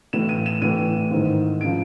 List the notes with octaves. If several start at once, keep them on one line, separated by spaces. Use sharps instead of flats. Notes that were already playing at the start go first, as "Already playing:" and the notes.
A2 E3 E7
D#7
E7
A2 E3 D#7
G#2 D#3
C#3 F3 D7